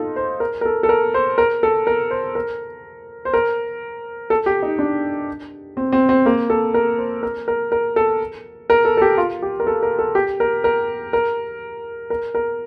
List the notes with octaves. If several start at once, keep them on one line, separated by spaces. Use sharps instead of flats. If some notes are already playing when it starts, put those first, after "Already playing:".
Already playing: D#4 F4 A4
C5
A#4
A#4
A4
A4
A#4
C5
A#4
A4
A#4
C5
A#4
C5
A#4
A4
G4
D#4
D4
C4
C4
C4
A#3
A4
A#4
C5
A#4
A#4
A#4
A4
A#4
A4
A4
G4
F4
G4
A#4
A4
A#4
A4
G4
A#4
A#4
A#4
A#4
A#4